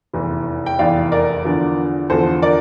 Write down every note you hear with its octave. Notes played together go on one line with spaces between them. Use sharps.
F1 E2 E3
G5
F1 E2 E3 D5 F5
A#4 D5
E2 D3 F3
E2 D3 F3 A4 C5
A#4 D5